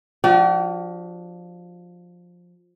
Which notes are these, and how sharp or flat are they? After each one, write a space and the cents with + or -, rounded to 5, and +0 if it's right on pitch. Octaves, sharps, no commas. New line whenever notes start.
F3 +15 D4 +20 G4 -45